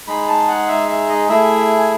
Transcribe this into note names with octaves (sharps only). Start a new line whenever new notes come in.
G#3 D#4 G#4 B5
A5
F#5
E5
E5
D#5
A3 E4 G#4 E5
G#5